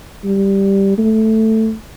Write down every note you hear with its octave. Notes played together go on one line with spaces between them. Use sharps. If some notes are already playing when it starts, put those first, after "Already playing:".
G3
A3